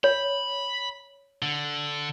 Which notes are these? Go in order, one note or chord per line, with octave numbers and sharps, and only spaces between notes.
C#5 B5
D3